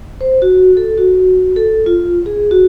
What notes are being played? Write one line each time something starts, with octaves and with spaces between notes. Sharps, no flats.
C5
F#4
A4
F#4
A4
F4
G#4
F#4